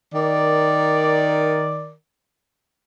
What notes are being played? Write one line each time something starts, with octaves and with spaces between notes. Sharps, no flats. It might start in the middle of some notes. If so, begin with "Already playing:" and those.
D#3 A#4 D5